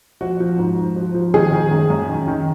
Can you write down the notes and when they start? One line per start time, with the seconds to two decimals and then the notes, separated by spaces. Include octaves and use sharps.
0.21 F3 F#4
0.40 F3
0.59 G#2
0.78 G#2
0.96 F3
1.14 F3
1.34 D#3 G#4
1.53 D#3
1.71 F#2
1.90 F#2
2.09 D#3
2.28 D#3